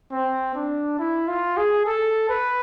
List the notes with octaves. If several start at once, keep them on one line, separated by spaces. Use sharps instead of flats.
C4
D4
E4
F4
G#4
A4
B4